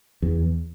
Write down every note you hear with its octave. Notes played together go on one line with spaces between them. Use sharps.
E2